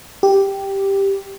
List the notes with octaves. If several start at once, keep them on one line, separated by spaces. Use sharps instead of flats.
G4